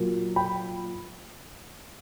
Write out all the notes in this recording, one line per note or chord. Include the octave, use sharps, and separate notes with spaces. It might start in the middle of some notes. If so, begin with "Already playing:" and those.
Already playing: A#2 F#3 A#3
G5 B5